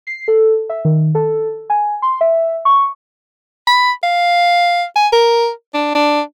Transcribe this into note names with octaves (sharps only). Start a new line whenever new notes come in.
C7
A4
E5
D#3
A4
G#5
C6
E5
C#6
B5
F5
G#5
A#4
D4
D4